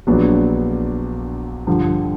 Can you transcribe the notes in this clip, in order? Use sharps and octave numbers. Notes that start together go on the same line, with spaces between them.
A#1 A#2 F#3 B3 D4
G2 D3 F3